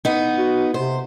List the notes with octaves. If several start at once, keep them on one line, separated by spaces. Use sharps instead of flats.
B3 D#4
F#4
C3 C5